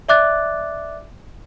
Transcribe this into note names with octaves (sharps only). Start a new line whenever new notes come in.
D5 E5 D6 F#6 A6